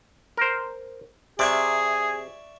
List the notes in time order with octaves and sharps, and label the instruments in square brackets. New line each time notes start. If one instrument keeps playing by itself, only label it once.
[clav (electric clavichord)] A#4 C5
[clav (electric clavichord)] C3 [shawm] G#4 [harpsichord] D5 E5 C#6